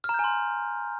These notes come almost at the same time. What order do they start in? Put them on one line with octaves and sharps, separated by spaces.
F6 A#5 G6 G#5 C6